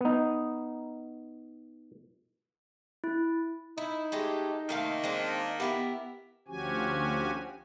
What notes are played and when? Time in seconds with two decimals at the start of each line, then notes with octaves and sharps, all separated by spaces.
0.01 B3 D#4
3.04 E4
3.78 D#4 E4
4.12 G#3 A3 G4
4.69 C3 D#3 A3 A#3 F5
5.04 G#3 C4 D4
5.60 B3 E4 G4 A#4
6.48 D2 F3 C#4 F#4 G4 G#5